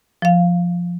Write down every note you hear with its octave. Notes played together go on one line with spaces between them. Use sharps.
F3 F5